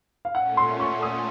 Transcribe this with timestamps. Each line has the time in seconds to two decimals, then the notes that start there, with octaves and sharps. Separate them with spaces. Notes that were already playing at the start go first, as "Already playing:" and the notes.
0.25 F5
0.35 A#2 A3 C#4 F#5
0.57 C6
0.80 C#6
1.02 D#6